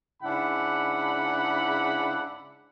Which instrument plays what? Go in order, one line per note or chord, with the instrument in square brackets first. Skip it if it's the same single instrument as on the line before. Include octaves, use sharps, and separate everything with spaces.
[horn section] G#2 C#3 D4 E4 F#5 B5